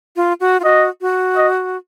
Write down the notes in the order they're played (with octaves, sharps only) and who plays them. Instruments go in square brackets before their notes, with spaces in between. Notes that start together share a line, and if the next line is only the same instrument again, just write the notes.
[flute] F4
F#4
F4
[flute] F#4 [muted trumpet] D#5
[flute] F#4
[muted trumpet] D#5